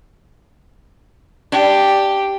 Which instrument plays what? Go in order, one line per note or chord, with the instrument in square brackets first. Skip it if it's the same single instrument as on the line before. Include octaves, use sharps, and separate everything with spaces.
[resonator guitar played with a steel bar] D4 [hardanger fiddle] G4